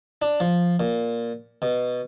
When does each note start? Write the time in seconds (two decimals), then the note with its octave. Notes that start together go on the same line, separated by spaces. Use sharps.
0.22 D4
0.40 F3
0.80 A#2
1.62 B2